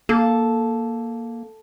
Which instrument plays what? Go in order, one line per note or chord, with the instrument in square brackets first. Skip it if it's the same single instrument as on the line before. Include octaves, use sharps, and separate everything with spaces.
[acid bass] A#3 [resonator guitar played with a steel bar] A4